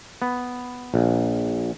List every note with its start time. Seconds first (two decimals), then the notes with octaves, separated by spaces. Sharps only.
0.22 B3
0.94 A#1